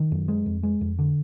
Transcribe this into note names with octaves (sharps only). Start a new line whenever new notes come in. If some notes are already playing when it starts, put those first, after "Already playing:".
Already playing: D#3
F#2
G#3
F2
G#3
F2
D3